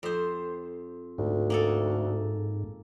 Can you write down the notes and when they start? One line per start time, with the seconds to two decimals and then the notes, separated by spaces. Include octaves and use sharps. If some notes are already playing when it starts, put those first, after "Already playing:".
0.03 F2 C5
1.18 D2 G#2
1.50 A#3 G#4 A4